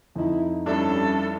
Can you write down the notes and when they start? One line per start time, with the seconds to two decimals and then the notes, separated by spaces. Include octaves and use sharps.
0.16 F2 D#4 E4
0.66 G2 G3 C#4 D4 E4 A4